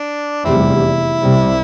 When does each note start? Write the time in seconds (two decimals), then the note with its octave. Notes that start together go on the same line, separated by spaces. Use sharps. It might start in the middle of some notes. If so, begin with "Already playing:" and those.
Already playing: D4
0.45 F1 E2 C3 G3 C4 E4
1.21 C2 C3 G3